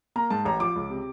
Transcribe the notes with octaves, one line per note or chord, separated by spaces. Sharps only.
A#3 A#5
G#2 A5
A1 A#5
F3 D6
C#2
C3